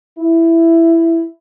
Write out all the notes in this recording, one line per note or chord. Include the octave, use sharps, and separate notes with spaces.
E4